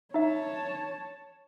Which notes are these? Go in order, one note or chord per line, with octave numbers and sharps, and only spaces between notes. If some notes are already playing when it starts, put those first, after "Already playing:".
D#4 C#5 E5 A5